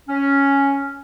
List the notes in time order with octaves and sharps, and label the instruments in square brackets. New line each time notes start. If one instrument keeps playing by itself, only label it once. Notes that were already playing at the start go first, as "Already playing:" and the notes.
[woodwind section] C#4